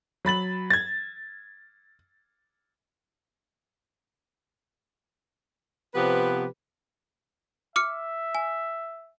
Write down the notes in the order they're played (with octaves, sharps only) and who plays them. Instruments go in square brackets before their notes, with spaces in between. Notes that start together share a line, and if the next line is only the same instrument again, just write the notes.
[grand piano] F#3 B5 A6 F#7
G#6 A6
[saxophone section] C3 F3 B3 G4 B4
[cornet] E5 [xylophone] D6 F6 C#7
[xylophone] G#5